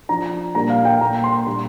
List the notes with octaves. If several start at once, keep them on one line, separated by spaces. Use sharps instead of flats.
F3 D4 A#5
A#2 G3 A#3 D4 A#5
F5
G5
A#2 A#3 D4 A#5
C6
A#2 G3 D4 C6